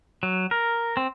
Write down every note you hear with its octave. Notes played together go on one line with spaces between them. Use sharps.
F#3
A#4
C4